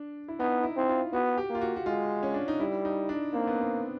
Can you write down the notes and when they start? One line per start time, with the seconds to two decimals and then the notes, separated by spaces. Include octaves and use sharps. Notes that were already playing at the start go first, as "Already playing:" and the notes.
Already playing: D4
0.28 E4
0.40 B3 D#4
0.64 E4
0.76 C4 E4
0.89 F4
1.13 B3 F#4
1.38 G4
1.50 A#3
1.55 F4
1.61 F#4
1.76 F#4
1.86 G#3 F4
2.23 C#4
2.34 D4
2.48 D#4
2.60 G3 E4
2.85 D#4
3.09 D4
3.34 A#3 C4
3.47 B3
3.60 C4